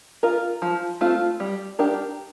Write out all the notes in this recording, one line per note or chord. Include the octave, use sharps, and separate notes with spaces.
F4 A#4
F3
A3 C4 F4
G3
D4 G4 A#4